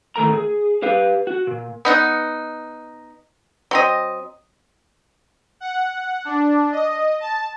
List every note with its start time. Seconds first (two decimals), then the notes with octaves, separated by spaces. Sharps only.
0.16 A2 D#3 A3 A#4 A#5
0.33 G#4
0.82 G4 B4 F5
1.27 F#4
1.47 A#2
1.85 B3 D#4 F#5
3.71 F#3 C4 D#5
5.60 F#5
6.25 D4
6.72 D#5
7.20 A5